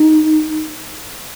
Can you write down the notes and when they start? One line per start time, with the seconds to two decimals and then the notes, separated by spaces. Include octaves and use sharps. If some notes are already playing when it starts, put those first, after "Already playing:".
Already playing: D#4